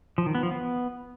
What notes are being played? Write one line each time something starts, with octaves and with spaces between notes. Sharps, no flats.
F3
D#3
B3
F3
B3